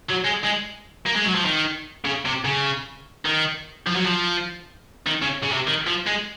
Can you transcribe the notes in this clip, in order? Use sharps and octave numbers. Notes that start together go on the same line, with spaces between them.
F#3
G#3
G#3
A#3
G#3
F#3
F3
D#3
C#3
C3
C#3
D#3
F3
F#3
F3
D#3
C#3
C#3
C3
D#3
F3
G#3